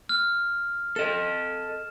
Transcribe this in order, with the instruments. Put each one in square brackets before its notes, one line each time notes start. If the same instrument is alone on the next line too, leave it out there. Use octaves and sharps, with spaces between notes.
[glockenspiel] F6
[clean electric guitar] A4 D#5 [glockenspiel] E7